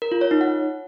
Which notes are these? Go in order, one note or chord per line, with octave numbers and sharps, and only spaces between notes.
A#4
F4
C#5
D#4
F#5